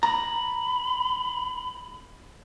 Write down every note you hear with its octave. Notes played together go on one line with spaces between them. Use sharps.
A#5 B5